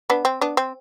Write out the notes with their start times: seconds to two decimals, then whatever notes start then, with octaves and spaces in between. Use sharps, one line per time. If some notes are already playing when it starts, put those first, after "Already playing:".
0.10 B3 D4
0.25 C4
0.41 B3 D4
0.57 C4